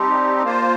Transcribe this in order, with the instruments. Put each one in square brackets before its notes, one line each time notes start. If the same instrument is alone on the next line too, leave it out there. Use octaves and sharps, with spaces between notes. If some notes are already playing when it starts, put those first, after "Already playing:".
Already playing: [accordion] G3 C4 D#4 G4 [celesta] A5 C6
[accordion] A#3 F4 C5